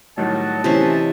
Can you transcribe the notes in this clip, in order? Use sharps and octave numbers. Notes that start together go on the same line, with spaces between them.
A2 D#3 F#3 G3 D#5 F#5 A5
C3 E3 C#4 C5